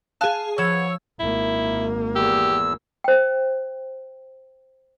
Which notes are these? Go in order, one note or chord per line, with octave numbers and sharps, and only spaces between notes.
G#4 F5 A5 F#6
F3 B3 C#5 E6 G#6 E7
G#1 A#3 E4
E2 G4 E6
C5 G5